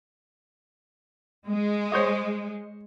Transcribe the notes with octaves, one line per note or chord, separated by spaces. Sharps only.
G#3
C5 C#5 D#5